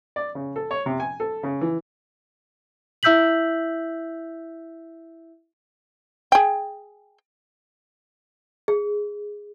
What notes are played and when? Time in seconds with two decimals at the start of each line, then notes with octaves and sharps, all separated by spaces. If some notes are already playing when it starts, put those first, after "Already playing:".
0.16 D5
0.35 C#3
0.56 A4
0.71 C#5
0.86 C3
1.00 G#5
1.20 A4
1.43 C#3
1.61 E3
3.03 E4 E5 E6 G6 B6 F#7
6.32 G#4 G5
8.68 G#4